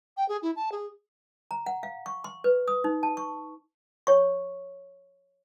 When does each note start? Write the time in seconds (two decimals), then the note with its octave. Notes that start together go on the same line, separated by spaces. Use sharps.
0.17 G5
0.29 G#4
0.42 E4
0.56 A5
0.72 G#4
1.51 A#5
1.66 F#5
1.83 F5
2.06 C#6
2.24 C6
2.44 B4
2.68 D#6
2.84 D#4
3.03 A5
3.17 C#6
4.07 C#5 C#6